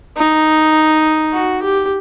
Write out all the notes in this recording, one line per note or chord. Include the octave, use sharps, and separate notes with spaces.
D#4
F#4
G4